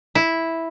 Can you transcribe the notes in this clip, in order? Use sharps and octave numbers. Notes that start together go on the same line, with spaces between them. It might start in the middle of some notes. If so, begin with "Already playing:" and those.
E4